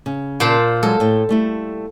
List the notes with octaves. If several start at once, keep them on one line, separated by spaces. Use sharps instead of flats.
C#3
A#2 C5 A5
F#3 G#3 A4
A2 G5
G3 A3 E4